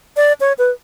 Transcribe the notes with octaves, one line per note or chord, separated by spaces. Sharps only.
D5
C#5
B4